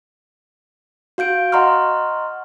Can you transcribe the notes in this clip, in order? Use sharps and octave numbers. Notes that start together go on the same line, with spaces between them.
F#4 F5 G6 D7
D#5 F#5 A#5 C6 C#6 F6